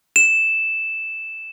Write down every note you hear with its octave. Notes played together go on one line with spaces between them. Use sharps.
E7